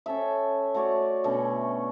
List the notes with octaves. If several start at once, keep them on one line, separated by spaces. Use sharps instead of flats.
C#4 A4 E5
A3 F#4 C#5 D5
B2 D3 A3 C#4